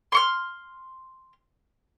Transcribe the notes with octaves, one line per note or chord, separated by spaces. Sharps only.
C6 C#6 F6